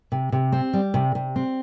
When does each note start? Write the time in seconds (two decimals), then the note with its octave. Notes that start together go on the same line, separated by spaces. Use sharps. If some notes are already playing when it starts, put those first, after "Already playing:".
0.12 C3
0.32 C3
0.52 C4
0.73 G3
0.94 C3
1.15 C3
1.36 C4